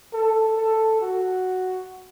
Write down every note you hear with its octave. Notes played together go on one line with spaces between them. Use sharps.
A4
A4
F#4